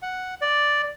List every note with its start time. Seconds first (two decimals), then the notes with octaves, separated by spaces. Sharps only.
0.02 F#5
0.41 D5